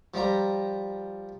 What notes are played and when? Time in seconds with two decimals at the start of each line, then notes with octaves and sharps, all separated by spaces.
0.14 F3 G3 A#5